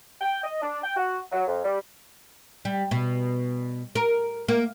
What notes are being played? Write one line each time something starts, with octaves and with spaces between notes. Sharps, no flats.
G5
D#5
D4
G5
F#4
F#3
F2
G3
G3
B2
A#4
A#3